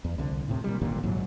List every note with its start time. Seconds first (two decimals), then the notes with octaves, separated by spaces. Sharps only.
0.04 E2
0.18 C2 D3
0.48 A2 C3
0.64 A#2 G3
0.82 G#1 D#2 A#2 D3
1.03 A#1 G#2 F#3